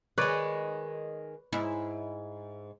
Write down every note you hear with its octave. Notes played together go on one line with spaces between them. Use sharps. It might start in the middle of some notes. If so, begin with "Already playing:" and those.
D#3 G#3 B4 C#5 D5
G#2 E4